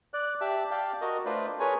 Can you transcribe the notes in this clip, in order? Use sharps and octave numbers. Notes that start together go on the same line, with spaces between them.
D5 F#6
G4 D5 E5 A5
D5 F5 G5 A5
F#4 A#4 D#5
A3 D4 F4 B4 C5 D5
G#4 A#4 B4 C#5 G#5